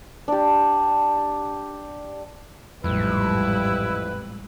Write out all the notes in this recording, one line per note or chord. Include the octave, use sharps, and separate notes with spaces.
D4 G4
A1 F2 G#2 G3 E4 B4